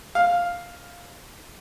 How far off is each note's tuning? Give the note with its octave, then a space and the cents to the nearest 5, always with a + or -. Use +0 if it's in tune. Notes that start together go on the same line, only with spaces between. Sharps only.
F5 +5